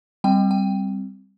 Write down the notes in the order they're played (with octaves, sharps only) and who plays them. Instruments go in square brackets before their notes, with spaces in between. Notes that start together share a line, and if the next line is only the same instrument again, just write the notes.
[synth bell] G3 C4 G5
G5